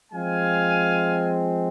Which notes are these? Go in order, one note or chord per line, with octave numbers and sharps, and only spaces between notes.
F3 G#3 C4 F5 G#5